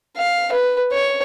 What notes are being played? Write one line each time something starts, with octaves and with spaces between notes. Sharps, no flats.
F5
B4
C#5